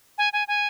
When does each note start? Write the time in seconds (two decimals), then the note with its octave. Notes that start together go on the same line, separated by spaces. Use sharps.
0.18 G#5
0.33 G#5
0.48 G#5